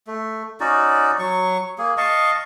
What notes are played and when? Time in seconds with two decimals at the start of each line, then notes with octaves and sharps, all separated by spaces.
0.07 A3
0.60 C#4 D#4 F#4 D5
1.19 F#3 C#6
1.78 A#3 G#4
1.98 D#5 F5 A5 C#6